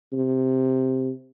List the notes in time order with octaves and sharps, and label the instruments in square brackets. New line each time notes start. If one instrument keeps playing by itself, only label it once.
[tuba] C3